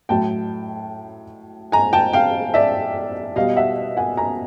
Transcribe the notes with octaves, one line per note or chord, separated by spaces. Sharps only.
A2 F#3 G5 A5
G#5 A#5
G5 A5
F5 G5
D5 E5
B2 G3 D#5 F5
E5 F#5
F#5 G#5
G#5 A#5